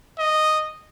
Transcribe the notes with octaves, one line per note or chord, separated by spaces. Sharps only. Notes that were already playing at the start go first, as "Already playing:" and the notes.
D#5